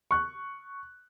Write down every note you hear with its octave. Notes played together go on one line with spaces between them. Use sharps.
C#6 F#6